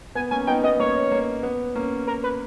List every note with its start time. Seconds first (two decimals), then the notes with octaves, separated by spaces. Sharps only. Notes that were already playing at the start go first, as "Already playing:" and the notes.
0.15 B3 G#5
0.31 A#3 C#4 G#5
0.47 B3 D#4 G5
0.63 B3 D#4 D#5
0.79 A#3 C#4 C#5
1.12 A#3
1.43 B3
1.75 A#3 C#4
2.07 A#4
2.24 B4